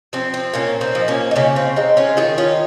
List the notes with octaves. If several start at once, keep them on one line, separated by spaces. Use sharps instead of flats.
F3 C4
C4
A#2 A#3 C#4
C4 D#4
F3
A#3 C#4
D#4
C#3 A#3 C#4
C4
G#3 C4 D#4
C#4 F4
D#3 F4 G#4
C#4 F4